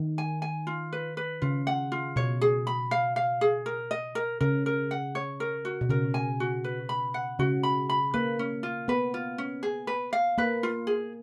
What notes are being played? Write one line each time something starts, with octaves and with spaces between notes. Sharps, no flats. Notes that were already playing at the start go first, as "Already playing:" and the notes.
Already playing: D#3
G#5
G#5
F4
B4
B4
C#3 F4
F#5
F4
B2 C#5
G#4
B5
F5
F5
G#4
A#4
D#5
A#4
C#3 A#4
A#4
F#5
C#5
A#4
F#4
B2
C#3 A#4
G#5
F#4
B4
B5
F#5
C#3 F#4
B5
B5
A#3 B4
C#4
F4
B3 B4
F4
C#4
G#4
B4
F5
A#3 B4
F4
G#4